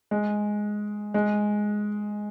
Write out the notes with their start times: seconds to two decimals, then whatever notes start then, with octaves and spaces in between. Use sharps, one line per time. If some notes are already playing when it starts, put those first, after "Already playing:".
0.11 G#3
1.14 G#3